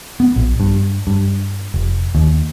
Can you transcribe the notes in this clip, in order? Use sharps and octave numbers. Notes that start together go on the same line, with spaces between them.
B3
A#1
G2
G2
F1
D#2